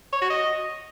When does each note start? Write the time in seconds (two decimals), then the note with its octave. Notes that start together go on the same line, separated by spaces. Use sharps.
0.13 C#5
0.21 F#4
0.30 D#5